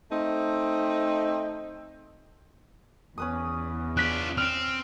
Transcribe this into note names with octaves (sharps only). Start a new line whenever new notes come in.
A3 C4 D#4
E2 C#4 B4 D#6
D4 F4 F#6 B6
C4 F6 D7